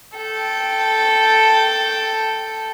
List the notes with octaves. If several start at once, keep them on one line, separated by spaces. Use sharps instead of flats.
A4 G5